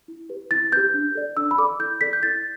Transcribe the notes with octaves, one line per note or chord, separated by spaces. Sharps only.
E4
G4 B4
E4 A6
G4 B4 G6
D4
A4 D5
D4 E6
B5
A4 D5 D6
E4 G6
A4 D5 B6
G6
E4 A6